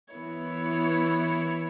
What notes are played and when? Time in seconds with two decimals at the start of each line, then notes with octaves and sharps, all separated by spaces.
0.14 E3 B3 E4 C#5